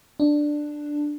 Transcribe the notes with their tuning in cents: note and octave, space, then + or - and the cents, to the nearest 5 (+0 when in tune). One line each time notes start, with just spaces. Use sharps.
D4 +10